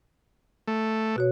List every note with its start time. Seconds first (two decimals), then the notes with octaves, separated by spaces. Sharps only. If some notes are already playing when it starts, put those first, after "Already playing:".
0.67 A3
1.16 B2 F#4 C#5